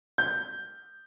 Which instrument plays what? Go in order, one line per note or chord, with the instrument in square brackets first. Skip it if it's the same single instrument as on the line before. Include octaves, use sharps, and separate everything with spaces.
[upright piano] G6